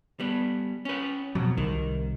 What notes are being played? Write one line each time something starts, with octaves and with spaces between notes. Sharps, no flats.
G3 B3
C#4 B4
F2 B2 F#3
C2 D#3